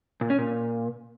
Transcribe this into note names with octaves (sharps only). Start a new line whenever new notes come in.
A#2
C#4
A#2